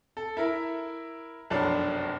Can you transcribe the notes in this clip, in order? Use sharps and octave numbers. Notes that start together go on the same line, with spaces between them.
A4
E4 A#4 E5
F1 B1 F#2 F#3 D4 A5